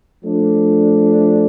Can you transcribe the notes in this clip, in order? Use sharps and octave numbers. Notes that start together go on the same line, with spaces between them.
F3 A3 D4